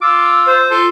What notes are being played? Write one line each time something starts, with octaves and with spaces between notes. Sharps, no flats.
F4 D6 E6
C5
F4 A4